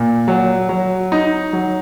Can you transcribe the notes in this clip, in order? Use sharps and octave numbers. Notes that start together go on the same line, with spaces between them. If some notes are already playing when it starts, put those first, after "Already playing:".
Already playing: A#2
F#3
F#3
D#4
F#3